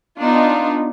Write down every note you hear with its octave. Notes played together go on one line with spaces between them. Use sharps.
B3 D4 D#4 F4